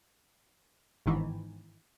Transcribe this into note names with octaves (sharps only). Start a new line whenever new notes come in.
G1 G#2 D#3 E3